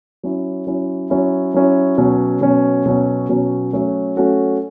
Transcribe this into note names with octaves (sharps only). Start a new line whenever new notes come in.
F#3 C#4 E4
F#3 C#4 E4
F#3 C#4 E4
F#3 C#4 E4
B2 F#3 C#4
B2 F#3 C#4
B2 F#3 C#4
B2 F#3 C#4
F#3 A3 C#4 F#4 A4
F#3 A3 C#4 F#4 A4